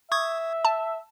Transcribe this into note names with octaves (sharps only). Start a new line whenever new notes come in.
E5 C#6 D#6 G#6
A5